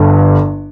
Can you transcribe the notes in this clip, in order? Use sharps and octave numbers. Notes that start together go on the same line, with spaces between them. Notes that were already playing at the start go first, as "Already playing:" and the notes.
Already playing: G1 G2 D3